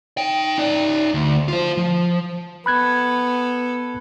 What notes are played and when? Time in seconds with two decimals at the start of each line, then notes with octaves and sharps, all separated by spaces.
0.17 D#4 G5
0.58 D#4 D5
1.14 D2
1.48 F4 C5
1.77 F3
2.66 B3 A4 B5 F#6 G#6